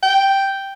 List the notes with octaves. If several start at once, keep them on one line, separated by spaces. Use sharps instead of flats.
G5